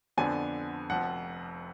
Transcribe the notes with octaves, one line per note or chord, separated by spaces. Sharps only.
F2 D3 F3 B3 D4 G#5
F1 F2 F3 F#5